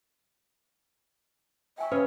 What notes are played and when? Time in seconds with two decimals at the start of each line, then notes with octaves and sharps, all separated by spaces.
1.78 E5 G5 G#5 C#6
1.91 C#3 G#4 B4 C#5